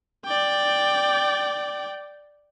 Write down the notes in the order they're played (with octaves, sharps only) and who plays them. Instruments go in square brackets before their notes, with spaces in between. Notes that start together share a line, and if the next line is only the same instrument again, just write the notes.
[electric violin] D5 G5